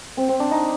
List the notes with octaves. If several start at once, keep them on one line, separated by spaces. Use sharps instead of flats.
C4
C4
D4
D#4